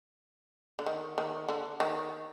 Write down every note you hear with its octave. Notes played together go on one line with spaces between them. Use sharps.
D3
D#3
D#3
D3
D#3